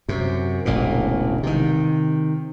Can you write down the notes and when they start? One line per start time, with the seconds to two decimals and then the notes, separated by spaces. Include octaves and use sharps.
0.08 F#2 C3
0.65 E1 A1 D2 A#2
1.43 C3 D#3